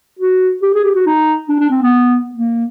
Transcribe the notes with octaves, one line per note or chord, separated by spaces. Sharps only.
F#4
G4
G#4
G4
F#4
D#4
D4
D4
C4
B3
A#3